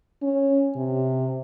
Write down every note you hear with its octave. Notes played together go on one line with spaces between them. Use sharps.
C#4
C3